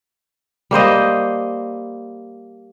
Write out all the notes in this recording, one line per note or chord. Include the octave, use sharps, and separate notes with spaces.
G3 A#3 C5 D#5